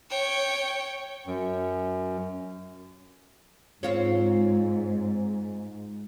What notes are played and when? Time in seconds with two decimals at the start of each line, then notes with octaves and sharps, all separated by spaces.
0.11 C#5 G5
1.27 F#2
3.83 G#2 C4 F4 C#5